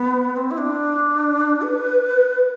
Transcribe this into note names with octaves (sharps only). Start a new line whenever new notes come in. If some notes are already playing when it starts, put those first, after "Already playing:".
Already playing: B3
C4
E4
D4
B4